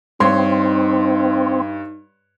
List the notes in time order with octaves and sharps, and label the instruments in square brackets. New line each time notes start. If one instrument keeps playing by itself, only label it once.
[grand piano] G2 C#5 C6 [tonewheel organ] C4 [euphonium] D#4